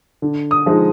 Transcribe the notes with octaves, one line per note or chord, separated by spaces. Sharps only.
D3
D#6
F3 G#3 D#4